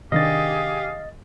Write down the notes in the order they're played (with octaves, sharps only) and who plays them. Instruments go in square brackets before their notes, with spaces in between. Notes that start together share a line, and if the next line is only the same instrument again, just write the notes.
[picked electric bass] C3 D#3 D4 [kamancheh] G4 G#4 [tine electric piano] D#5 A6 [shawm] F5